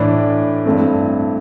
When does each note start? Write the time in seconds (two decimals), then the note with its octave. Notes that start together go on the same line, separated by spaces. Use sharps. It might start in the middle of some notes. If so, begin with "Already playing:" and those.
Already playing: A2 E3 A3 D4
0.65 G2 E3 A3 C4